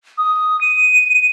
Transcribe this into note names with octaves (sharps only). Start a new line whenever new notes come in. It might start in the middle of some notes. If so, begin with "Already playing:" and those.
D#6
D#7